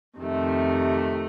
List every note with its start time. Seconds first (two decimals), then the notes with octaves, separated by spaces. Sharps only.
0.19 F2 C3 D#3 A3